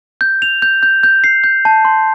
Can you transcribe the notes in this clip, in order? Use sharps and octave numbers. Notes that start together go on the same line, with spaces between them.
G6
F7
G6
G6
G6
C7
G6
A5
C6